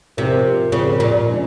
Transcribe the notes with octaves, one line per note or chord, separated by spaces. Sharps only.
C3 F3 C4 F4 A#4
C#3 F3 C4 F4 A#4
A#2
F3 G#3 C#4